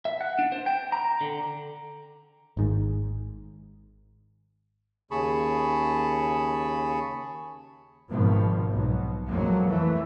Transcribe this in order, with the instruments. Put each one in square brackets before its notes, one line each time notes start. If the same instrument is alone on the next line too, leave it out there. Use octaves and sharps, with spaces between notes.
[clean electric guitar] E5
F#5
D4
C5
G5
A#5
D3
[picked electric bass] G#1 G#2
[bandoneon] D#2 C#3 G#4 A5 B5 C#6
[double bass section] G#1 B2 F3
B1 B2
F2 F#3 G#3 A#3
E3 A3